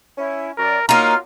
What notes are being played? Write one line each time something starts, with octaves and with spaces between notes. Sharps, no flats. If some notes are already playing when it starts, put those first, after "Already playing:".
C#4 E4
F#2 A#4 D5
F#3 A#3 D#4 F4 F6